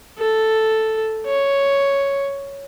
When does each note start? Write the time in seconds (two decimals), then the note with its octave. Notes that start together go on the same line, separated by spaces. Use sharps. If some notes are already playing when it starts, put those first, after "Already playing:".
0.18 A4
1.26 C#5